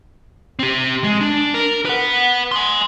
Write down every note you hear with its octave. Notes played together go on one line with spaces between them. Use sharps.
C4 G4
G#3
D4
A#4
B4 F#5
G#5 C6